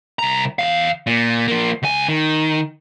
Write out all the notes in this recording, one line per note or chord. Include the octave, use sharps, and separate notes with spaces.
C2 A#5
E2 F5
A#2
F3 A#3
C#2 G#5
D#3